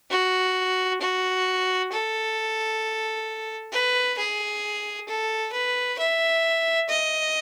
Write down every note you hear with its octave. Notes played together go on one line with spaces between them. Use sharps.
F#4
F#4
A4
B4
G#4
A4
B4
E5
D#5